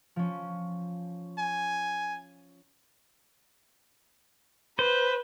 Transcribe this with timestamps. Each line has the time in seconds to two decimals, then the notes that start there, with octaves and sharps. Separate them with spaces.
0.16 F3 C#4
1.38 G#5
4.79 B4 C5